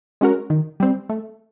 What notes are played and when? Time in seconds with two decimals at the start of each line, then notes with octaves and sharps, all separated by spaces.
0.21 G#3 C#4 F#4 A#4
0.50 D#3
0.80 G3 C4
1.09 A3